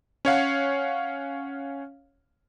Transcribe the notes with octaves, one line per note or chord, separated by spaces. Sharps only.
C#4 C#5 F5 F#5